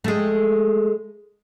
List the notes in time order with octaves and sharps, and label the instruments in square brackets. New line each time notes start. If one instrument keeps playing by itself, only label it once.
[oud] G#3 A3